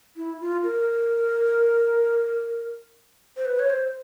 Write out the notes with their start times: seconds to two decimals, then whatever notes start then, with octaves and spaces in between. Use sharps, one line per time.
0.17 E4
0.41 F4
0.64 A#4
3.37 C5
3.45 B4
3.59 C#5
3.70 C5